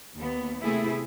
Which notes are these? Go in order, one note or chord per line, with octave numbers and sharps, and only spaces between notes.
D#2 B3
C3 A3 B3 E4 G#4